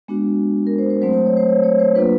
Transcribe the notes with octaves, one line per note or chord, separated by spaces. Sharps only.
G#3 B3 D4 F#4
A#4
C5
C5
F#3 A3 C4 C5
C5
C#5
C5
C#5
C#5
C5
F#3 A#3 D4 F4 B4